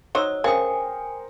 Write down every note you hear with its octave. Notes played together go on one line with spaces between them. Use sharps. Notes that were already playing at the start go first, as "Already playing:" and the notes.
F#3 D#4 C5 C#5 E6
C#3 A#4 C5 G5 G#5 D#6 C#7